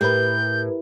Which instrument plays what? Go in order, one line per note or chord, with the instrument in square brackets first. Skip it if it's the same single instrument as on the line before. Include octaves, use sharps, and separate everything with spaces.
[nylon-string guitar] A2 [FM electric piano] G4 A#4 B4 [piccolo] G6